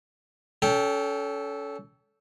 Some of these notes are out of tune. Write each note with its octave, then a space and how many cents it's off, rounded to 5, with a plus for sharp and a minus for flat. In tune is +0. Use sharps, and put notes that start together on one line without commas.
C#4 +30 A4 -10 G5 +0